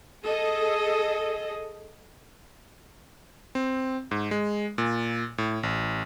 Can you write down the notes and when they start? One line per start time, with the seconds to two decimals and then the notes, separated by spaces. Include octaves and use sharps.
0.24 G#4 A4 D#5
3.55 C4
4.11 G#2
4.31 G#3
4.78 A#2
5.38 A2
5.63 A1